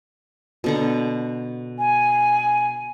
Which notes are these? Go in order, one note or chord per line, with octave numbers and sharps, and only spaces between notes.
B2 D3 A#5
G#5